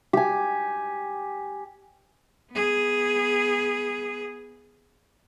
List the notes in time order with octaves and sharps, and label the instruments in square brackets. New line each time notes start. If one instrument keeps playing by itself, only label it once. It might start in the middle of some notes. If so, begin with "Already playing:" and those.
[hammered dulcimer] G4 G#5
[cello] B3 G#4